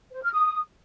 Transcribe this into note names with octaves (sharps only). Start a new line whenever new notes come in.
C5
F6
D#6